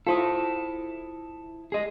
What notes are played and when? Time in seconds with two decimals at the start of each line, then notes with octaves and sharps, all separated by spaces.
0.07 E4 F4 A4 C5 D#6
1.72 G#4 D#5